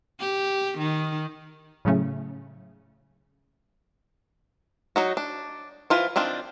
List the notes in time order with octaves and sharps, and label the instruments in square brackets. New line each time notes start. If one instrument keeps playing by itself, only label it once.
[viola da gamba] G4
D#3
[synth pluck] A2 C#3 F#3 A3 C#4
[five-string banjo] F#3 D#4 F#4
D4
E3 F4 C5
D#3 C4 D4 F4